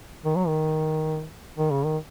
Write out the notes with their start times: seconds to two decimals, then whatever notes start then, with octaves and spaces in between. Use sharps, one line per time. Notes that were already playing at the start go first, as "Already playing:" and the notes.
0.25 D#3
0.36 F#3
0.47 D#3
1.57 D#3
1.71 C#3
1.85 D#3